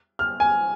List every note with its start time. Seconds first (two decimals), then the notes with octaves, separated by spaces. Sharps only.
0.19 F6
0.40 G#5